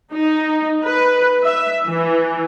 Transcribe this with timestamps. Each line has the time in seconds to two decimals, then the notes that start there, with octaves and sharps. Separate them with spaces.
0.13 D#4
0.84 B4
1.43 E5
1.87 E3